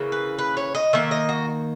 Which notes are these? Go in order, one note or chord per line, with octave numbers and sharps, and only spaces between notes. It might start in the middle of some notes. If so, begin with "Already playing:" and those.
Already playing: C#3 E3 A#3
B4
B4
C#5
D#5
D#3 A#3 E5
D#5
F#4